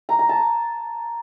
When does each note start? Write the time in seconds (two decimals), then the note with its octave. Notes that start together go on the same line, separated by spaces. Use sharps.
0.09 A#5
0.19 A#5
0.29 A5